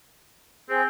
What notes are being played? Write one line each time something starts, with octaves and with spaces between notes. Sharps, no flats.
C4 G#4 C5 G5